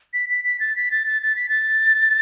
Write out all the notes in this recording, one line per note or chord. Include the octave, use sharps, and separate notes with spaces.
B6
B6
B6
A6
B6
A6
A6
A6
B6
A6